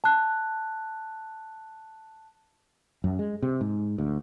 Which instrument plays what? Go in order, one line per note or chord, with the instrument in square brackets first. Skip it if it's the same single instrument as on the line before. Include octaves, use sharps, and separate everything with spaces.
[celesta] A5 F#6
[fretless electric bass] F#2
G#3
C3
G#2
D2